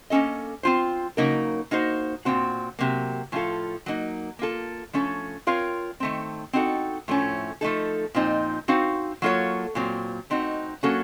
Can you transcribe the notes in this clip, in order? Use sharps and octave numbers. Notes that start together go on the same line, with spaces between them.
A#3 C#4 A4 D#5
C4 F4 C5
C#3 F#3 A#3 D#4 A#4
A#3 D#4 F#4 C5
A#2 F3 C4 F#4
C3 F#3 A#3
A2 F3 C4 F4 A4
F#3 A#3 D#4
A#3 F4 A4
F3 A3 C#4 A4
C4 F4 A#4 C#5 F5
D#3 A3 C4
C4 D#4 F#4 A4
A2 F3 A3 C#4
F3 A3 D#4 A4
A#2 F3 C4 D#4
C4 D#4 F#4 C5 F5
F#3 A#3 F4 A4 C#5
A#2 F#3 C4
A3 C4 D#4 F#4
F#3 A#3 C#4 F#4 A4